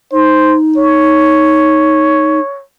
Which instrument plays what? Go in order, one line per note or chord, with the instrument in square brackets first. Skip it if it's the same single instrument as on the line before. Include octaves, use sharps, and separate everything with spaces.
[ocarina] D#4 [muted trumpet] C5
[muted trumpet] C#5